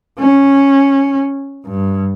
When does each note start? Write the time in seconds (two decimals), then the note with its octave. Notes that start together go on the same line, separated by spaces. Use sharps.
0.19 C#4
1.66 G2